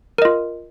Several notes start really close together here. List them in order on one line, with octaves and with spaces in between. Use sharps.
A#4 D#5 F4